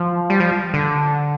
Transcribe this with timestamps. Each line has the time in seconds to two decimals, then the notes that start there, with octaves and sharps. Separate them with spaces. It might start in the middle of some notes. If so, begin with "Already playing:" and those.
Already playing: F3
0.30 G3
0.40 F3
0.74 D3